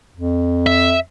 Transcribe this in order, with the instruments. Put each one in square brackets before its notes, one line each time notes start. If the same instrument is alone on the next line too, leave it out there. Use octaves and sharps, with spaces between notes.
[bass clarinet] F2
[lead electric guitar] E5